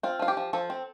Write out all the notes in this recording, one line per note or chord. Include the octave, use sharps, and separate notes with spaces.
C4 F4
F3 F4
G4
F3
F3 A4
C4